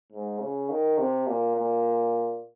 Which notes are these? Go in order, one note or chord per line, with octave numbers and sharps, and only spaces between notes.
G#2
C#3
D#3
C3
A#2
A#2